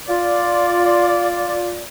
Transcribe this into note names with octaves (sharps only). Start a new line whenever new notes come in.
F4 D5